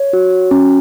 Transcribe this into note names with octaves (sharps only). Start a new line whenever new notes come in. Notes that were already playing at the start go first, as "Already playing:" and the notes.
Already playing: C#5
F#4
C#4